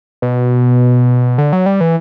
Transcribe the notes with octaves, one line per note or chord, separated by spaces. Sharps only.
B2
D3
F#3
G3
E3